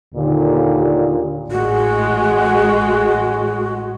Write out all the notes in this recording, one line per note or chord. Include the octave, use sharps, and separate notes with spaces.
D#2 A#2 D3
A1 G#3 F#4